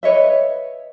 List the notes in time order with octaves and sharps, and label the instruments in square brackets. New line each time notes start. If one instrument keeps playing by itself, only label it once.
[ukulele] B4 C#5 D#5 E5